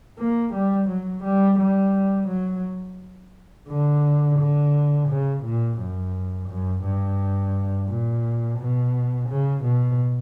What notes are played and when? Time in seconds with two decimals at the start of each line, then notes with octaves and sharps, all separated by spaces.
0.19 A#3
0.54 G3
0.89 F#3
1.24 G3
1.59 G3
2.28 F#3
3.69 D3
4.39 D3
5.09 C#3
5.44 A#2
5.79 F#2
6.48 F#2
6.85 G2
7.88 A#2
8.60 B2
9.30 C#3
9.64 B2